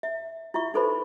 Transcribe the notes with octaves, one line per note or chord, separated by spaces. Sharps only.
E5
E4 F4 E5 C#6
D#4 F#4 A4 B4 C5 B5